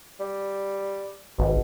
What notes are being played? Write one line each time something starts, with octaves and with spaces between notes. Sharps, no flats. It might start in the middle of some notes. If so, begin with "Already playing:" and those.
G3
G#1 B2